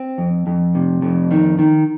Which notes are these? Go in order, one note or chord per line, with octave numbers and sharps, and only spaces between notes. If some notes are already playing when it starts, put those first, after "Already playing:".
Already playing: C4
F2
F2
C3
F2
D#3
D#3